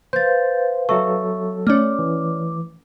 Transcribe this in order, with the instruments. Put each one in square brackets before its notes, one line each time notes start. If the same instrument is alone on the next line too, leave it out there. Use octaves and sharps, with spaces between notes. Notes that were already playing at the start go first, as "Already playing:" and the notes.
[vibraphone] B4 F5 [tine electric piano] C5 [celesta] G6 A6
[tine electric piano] F#3 A4 [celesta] E5 C#6
[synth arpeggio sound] A3 C#4 [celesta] C#5 D5 F6 [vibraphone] D6
[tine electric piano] E3